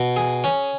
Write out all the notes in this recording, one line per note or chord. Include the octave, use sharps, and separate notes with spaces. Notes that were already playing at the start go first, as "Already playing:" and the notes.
Already playing: B2
G#4
C#4